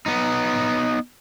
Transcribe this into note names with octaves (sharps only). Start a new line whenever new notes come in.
B3 D#4